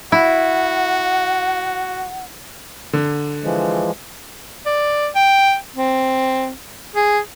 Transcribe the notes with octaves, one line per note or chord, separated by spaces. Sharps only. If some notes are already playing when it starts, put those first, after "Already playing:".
E4 F#4 F#5
D3
E3 F3 G#3
D5
G5
C4
G#4